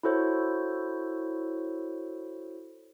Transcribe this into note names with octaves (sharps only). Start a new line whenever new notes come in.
E4 F#4 A4 C5 C#5